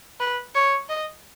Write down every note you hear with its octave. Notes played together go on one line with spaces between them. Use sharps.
B4
C#5
D#5